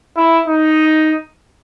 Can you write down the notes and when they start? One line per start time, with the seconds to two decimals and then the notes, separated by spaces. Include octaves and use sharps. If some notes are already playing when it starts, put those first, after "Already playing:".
0.17 E4
0.48 D#4